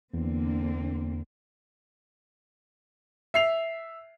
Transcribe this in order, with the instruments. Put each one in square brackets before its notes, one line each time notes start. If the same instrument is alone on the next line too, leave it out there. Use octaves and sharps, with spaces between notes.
[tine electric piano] E2 [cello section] D3 A#3 C4
[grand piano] E5 C7 F7